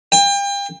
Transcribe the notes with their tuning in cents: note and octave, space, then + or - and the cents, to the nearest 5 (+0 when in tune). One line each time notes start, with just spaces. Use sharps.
G5 +35